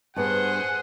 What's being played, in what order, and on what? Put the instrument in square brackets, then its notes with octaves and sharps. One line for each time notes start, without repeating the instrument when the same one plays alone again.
[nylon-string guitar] G2 B3 [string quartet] G#4 C5 [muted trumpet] F#5